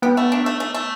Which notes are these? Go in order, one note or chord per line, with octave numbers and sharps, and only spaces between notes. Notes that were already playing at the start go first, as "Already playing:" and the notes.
B3 G4
A3
D4
A3
A3
A3